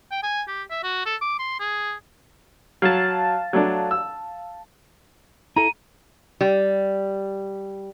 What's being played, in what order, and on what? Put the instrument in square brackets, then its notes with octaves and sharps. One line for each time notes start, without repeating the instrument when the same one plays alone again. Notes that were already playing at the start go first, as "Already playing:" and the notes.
[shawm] G5
G#5
G4
E5
F#4
A4
D6
C6
G#4
[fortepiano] F#3 [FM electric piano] F5 A5
[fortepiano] F#3 A3 D4
E6
[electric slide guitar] E4 A4 [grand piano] A#5 [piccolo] D#7
[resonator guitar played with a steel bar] G3